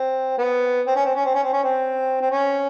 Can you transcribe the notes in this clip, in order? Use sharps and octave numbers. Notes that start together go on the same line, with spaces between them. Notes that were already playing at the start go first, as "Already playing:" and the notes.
Already playing: C4
B3
C4
C#4
C4
C#4
C4
C#4
C4
C#4
C4
C4
C#4